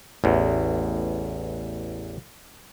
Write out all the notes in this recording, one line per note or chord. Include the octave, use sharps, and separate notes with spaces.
A1 E2